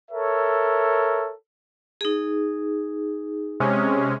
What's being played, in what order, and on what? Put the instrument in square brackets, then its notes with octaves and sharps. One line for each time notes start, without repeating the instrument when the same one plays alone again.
[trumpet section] A4 A#4 C#5 E5
[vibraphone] D#4 G#4
[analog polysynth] C3 G#3 C#4